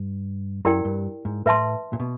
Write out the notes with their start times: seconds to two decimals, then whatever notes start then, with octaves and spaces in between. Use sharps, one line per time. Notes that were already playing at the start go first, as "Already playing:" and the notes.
Already playing: G2
0.65 F#2 E4 G4 A#4 D5 G5
0.85 G2
1.25 G#2
1.46 A2 B4 E5 A5 C6
1.93 A#2
2.00 B2